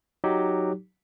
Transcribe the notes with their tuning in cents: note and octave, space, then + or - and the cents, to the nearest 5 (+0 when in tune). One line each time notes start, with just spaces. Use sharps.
F#3 +0 D#4 +0 G4 +0